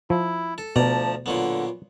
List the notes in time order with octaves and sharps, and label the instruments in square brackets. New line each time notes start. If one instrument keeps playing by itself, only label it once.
[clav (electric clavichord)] F3 [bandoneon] E4
[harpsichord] A4
[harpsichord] D2 D5 A#5 [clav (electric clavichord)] B2 [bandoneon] F3 A5
[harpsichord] A#2 F#3 B3 [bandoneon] D3